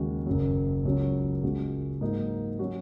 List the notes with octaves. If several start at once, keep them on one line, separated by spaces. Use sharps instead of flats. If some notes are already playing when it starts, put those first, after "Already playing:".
Already playing: D#2 C#3 G#3 F#4
F#1 F#2 C#3 F#3
C#2 C#3 F#3 C#4 F#4
C#2 C#3 G#3 F#4
G#2 F#3 A#3 D#4
F#3 C#4 F#4